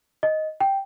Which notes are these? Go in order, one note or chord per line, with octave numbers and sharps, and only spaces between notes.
D#5
G5